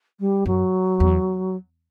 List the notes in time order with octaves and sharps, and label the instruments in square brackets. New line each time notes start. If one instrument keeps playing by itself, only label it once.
[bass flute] G3
[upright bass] F#2 [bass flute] F#3
[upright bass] E2